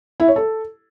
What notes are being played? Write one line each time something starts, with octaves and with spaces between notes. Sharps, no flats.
E4
C#5
A4